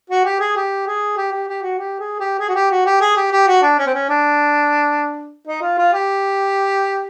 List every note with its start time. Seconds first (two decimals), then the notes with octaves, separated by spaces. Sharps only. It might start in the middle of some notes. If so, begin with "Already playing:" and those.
0.09 F#4
0.25 G4
0.39 G#4
0.56 G4
0.86 G#4
1.17 G4
1.32 G4
1.48 G4
1.62 F#4
1.78 G4
1.99 G#4
2.19 G4
2.39 G#4
2.48 F#4
2.55 G4
2.71 F#4
2.85 G4
3.01 G#4
3.16 G4
3.31 G4
3.47 F#4
3.62 D4
3.78 C#4
3.86 C4
3.93 C#4
4.09 D4
5.47 D#4
5.62 F4
5.78 F4
5.93 G4